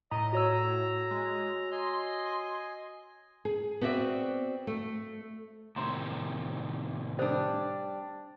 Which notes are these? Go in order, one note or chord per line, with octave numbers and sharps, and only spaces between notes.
A2 D#5 A#5 D#6
F#4 C#5 A#5 E6
G#3
D#5 G#5 C6
G#4
B3 C4 F#4 D5 E5
A3
A2 C3 D#3 A#5 C6
G3 D4 A4 C5 D5